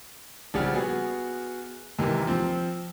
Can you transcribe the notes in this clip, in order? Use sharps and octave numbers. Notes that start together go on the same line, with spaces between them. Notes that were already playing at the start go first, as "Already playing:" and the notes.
A#1 C#3 G3 F#5 F6
B3 F#4 G#4
D#2 G#2 C3 D#3 E3
F3 C4